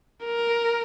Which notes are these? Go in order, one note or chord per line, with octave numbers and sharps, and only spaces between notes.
A#4